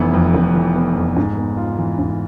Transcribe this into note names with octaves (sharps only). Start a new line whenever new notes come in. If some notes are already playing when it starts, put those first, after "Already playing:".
Already playing: F1 E3 B3
F2
F1
E3
B3
F2
G#2
B3
F4
E3
G#2